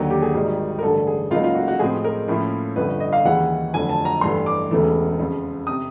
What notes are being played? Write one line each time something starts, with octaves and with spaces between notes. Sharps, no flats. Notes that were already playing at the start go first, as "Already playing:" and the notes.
Already playing: D#2 D3 F#3 A#3
G4
G#4
G#1 G#2 D#3 G3
A#4
A1 G2 D3 A4
G#4
C#2 C#3 F#3 A#3 D#4 F4
F4
F#4
F#4
A2 F3 G#3 C4 G#4
A#4
A2 F3 A#3 C#4 E4
G1 F2 D3 B4
D#5
F5
D#2 C#3 E3 G#3 C#4 F#5
F1 F2 D3 F#3 G#5
A5
A#5
A1 G2 E3 A3 C6
D6
E1 E2 C#3 E3 A3
F2 C#3 F3
C3 D#6